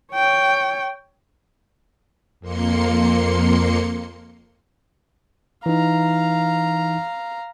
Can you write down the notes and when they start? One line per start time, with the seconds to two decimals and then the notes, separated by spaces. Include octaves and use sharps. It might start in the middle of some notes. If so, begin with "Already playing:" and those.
0.13 C#5 G5
2.40 F2 A#3 C6 C#7
5.66 E3 D#4 F5 A#5